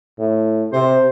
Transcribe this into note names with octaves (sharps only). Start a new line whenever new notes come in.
A2
C3 C5